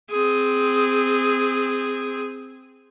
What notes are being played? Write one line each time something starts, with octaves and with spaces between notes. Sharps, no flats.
C4 G#4